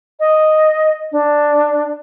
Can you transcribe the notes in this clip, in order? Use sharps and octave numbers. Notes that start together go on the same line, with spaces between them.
D#5
D4